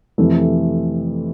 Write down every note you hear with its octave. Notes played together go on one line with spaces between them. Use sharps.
F2 C3 E3 A3